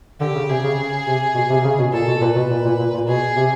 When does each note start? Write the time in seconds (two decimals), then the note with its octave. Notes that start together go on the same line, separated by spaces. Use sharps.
0.20 D3 G4
0.35 C#3
0.50 C3 G#4
0.64 C#3
0.78 C#3
1.07 C3
1.35 B2
1.50 C3
1.64 C#3
1.78 B2
1.93 A#2 A4
2.07 B2
2.21 A#2 B4
2.36 B2
2.50 A#2
2.64 A#2
2.79 A#2
2.94 A#2
3.07 B2 G#4
3.36 C3